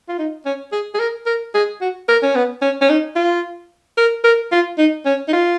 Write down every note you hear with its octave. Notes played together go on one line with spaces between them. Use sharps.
F4
D#4
C#4
G#4
G#4
A#4
A#4
G#4
F#4
A#4
C#4
B3
C#4
C#4
D#4
F4
A#4
A#4
F4
D#4
C#4
D#4
F4